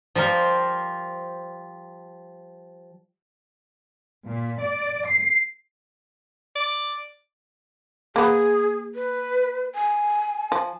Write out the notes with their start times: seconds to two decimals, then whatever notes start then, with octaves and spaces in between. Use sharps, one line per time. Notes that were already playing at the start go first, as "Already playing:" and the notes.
0.15 F3 G3 A#4 C5
4.26 A#2
4.61 D5
5.07 C7
6.55 D5
8.16 A#3 B3 G#4
8.95 B4
9.75 G#5
10.52 F3